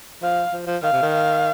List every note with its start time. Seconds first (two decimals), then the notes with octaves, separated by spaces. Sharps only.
0.22 F3 F5
0.53 F3
0.67 F3
0.82 D#3 F5
0.92 C3
1.02 D#3
1.12 F5